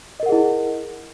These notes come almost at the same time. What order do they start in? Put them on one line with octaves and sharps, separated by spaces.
D#5 A#4 F#5 G#4 E4